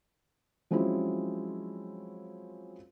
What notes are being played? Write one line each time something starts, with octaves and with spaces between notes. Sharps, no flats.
F3 F#3 G#3 C4 C#4 E4